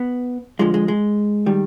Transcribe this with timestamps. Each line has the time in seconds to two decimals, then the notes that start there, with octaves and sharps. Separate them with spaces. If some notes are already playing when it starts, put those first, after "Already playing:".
Already playing: B3
0.59 F2 D3 F3 G#3
0.74 G#3
0.88 G#3
1.46 D#3 G3